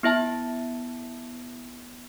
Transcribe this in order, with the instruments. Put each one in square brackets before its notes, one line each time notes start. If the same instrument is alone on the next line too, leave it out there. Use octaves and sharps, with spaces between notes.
[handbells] B3 E4 E5 A5